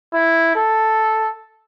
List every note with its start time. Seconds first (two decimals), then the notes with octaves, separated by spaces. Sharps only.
0.14 E4
0.56 A4